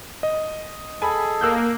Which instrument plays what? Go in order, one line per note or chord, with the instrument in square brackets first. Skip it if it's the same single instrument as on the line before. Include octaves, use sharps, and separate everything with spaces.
[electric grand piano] D#5
[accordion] G#4 A4 [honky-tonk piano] G#5 B5
[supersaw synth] A#3 [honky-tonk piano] E6 F#6 G6